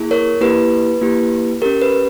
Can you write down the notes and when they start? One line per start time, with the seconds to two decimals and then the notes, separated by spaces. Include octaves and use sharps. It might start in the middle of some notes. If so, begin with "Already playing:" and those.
Already playing: A#3 E4 G#4
0.11 A#4 C#5
0.41 A#3 E4 G4 B4
1.01 A#3 E4 G4
1.62 C#4 G4 A#4
1.82 B4